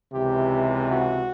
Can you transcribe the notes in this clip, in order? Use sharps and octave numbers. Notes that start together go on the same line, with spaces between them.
C#2 C3 E3 G4
F#4